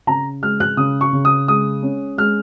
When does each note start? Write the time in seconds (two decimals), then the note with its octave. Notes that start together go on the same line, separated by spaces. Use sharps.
0.07 C#3 A#5
0.42 G#3 F6
0.60 F#6
0.77 C#3 D#6
1.01 C#6
1.13 C#3
1.25 D#6
1.48 G#3 D#6
1.83 C#4
2.18 G#3 F6